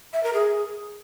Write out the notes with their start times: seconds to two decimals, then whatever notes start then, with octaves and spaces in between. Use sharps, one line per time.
0.13 E5
0.23 A#4
0.34 G#4